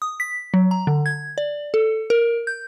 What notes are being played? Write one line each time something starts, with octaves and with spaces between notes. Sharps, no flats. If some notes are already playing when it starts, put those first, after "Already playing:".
D#6
B6
F#3
A#5
D3
G#6
D5
A4
A#4
G6